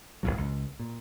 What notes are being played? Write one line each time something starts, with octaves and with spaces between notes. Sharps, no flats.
F#1 C#2 A2 F#3
C#2
A#2